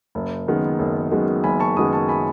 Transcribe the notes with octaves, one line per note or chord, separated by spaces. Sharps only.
F#1
F#2 D#3 G#3 B3
F#1
F#2 D#3 G#3 B3
F#1 G#5 B5
A5 C#6
F#2 D#3 G#3 B3 B5 D#6
A5 C#6
G#5 B5